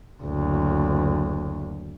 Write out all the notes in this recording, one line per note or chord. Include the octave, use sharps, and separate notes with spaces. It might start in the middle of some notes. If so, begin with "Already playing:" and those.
F#1 D2